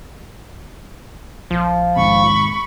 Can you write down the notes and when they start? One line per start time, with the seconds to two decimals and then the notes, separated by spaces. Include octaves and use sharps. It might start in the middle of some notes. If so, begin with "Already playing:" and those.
1.51 A#1 F3
1.96 D#2 G#2 C3 B5 C#6